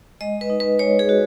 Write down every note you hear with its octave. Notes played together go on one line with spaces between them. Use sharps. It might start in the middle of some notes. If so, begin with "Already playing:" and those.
G#3 D#5
B4
D#4
B4
G#3 C#5
G#4
F#4